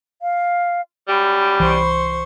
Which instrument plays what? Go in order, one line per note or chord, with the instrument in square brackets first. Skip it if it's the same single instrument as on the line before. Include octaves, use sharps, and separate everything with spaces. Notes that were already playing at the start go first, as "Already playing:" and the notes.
[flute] F5
[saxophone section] F#2 G3 [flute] B5
[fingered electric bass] C2 E3 [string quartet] C5 C6 C#6